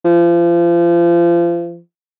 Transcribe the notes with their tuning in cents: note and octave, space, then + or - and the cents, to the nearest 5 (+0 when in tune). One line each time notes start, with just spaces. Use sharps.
F3 -35